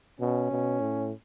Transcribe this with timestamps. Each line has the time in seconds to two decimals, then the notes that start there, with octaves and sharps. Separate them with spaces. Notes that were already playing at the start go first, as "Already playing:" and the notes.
0.20 B2 C#4
0.51 B2
0.80 A2